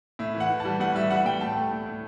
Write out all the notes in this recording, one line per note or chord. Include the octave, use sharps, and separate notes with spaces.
A2 E5
E3
F#5
E3
A5
G3
A2 F#5
G3 E5
G3 F#5
A2 G5
A2 A5
A3
A2
A2